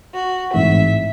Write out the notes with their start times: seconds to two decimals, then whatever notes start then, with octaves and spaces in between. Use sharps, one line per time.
0.13 F#4
0.54 A1 G#2 E3 C4 E4 E5